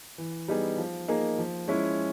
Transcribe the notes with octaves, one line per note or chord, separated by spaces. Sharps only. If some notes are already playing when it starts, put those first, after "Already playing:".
E3
G3 B3 D#4 G#4
F3
A#3 D#4 G#4
F3
G#3 C#4 E4